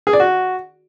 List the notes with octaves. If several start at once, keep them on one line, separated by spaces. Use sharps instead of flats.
G#4
D5
F#4